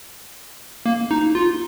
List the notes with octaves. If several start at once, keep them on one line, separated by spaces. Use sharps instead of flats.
A#3
D#4
F4